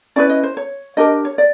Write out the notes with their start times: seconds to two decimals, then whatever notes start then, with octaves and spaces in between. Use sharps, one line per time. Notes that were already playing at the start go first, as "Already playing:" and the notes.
0.16 C#4 E4 G#4 B4 D5
0.29 D#5
0.43 C5
0.57 C#5
0.97 D4 G4 A#4 D#5
1.25 C#5
1.38 D5